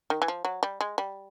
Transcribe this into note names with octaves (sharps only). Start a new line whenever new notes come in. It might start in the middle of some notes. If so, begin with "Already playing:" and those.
D#3
E3
F3
F#3
G3
G#3
G3